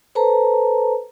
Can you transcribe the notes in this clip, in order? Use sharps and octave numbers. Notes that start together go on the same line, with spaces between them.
A4 B4 C5 A5 A#5